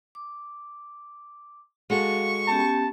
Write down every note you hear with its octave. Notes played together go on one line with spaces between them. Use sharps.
D6
G#3 F#4 A4 F5 C#6
B3 C#4 G4 A5